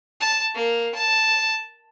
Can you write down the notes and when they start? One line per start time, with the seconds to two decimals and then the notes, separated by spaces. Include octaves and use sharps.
0.20 A5
0.54 A#3
0.95 A5